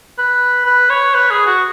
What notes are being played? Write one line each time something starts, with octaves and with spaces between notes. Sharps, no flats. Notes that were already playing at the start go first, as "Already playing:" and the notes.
B4
B4
C#5
B4
G#4
F#4